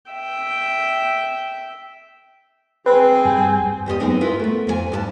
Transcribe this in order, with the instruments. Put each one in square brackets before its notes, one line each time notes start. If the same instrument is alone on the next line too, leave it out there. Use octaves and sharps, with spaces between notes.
[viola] E5 G5
[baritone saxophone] C4 [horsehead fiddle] G#4 G#5 [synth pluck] B4
[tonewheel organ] G2 G3 G6
[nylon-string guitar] E2 G4 C5 D#5
F#2 B3 C4 D#4 G#4
E4 F4 A#4 B4
A3 B3
F2 F4 G#5
G2 G4 A5